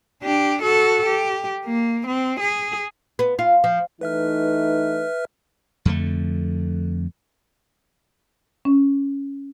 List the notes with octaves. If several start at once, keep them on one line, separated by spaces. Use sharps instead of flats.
D4 G4
F#4 A4
G4
A#3
C4
G#4
B3
F4
F3
E3 A3 D#4 B4 E5 F6
F2 D3 A3
C#4